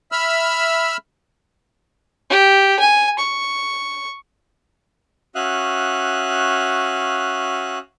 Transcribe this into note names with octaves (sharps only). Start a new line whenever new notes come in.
E5 B5 E6 F6
G4
G#5
C#6
C#4 F#4 E5 F5 D#6 F#6